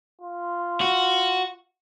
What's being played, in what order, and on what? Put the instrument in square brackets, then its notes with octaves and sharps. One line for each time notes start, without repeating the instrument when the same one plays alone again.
[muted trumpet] F4
[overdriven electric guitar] F#4